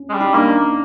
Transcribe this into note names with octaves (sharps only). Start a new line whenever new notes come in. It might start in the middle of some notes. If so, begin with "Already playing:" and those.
Already playing: C#4
G#3
G3
D#4
A#3 D4